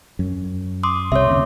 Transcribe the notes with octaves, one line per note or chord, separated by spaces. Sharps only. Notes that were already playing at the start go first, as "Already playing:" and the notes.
F#2
C6 D6 D#6
C2 C3 C#5 E5
D#2 C#3